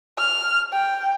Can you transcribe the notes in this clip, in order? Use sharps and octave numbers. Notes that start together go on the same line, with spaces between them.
F6
G5